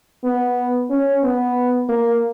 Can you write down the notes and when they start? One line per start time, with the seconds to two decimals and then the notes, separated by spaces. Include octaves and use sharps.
0.24 B3
0.90 C#4
1.23 B3
1.89 A#3